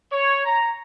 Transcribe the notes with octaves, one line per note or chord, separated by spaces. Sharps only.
C#5
A#5